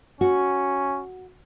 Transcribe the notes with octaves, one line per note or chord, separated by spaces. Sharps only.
C#4 F#4